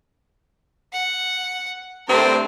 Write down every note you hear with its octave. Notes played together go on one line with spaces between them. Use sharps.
F#5
G2 C3 A3 C4 A#4